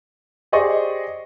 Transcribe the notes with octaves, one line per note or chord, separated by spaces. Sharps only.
G4 G#4 C5 D5 D#5 C#6